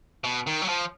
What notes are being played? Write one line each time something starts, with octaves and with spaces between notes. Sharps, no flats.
B2
D#3
F#3
F3